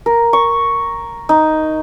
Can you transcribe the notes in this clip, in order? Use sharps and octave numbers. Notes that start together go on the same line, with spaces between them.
A#4
C#6
D#4